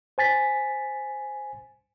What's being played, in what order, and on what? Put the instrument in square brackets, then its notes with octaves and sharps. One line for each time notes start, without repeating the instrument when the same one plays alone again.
[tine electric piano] C5 G#5 A6 B6